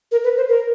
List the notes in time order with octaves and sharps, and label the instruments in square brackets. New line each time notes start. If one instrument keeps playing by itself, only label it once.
[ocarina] A#4
B4
C5
A#4